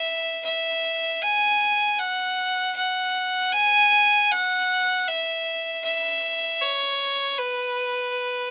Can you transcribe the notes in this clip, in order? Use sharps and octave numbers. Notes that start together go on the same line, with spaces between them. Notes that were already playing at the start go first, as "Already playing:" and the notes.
Already playing: E5
E5
G#5
F#5
F#5
G#5
F#5
E5
E5
C#5
B4